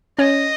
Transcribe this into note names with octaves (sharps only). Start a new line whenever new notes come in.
C#4 C#5 D#5